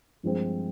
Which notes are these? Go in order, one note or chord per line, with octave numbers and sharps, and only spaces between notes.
G2 F3 G#3 C4